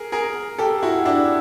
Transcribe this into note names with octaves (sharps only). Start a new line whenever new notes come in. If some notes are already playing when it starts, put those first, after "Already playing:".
Already playing: G#4 A#4
G#4 A#4
G4 A4
E4 F#4
D4 E4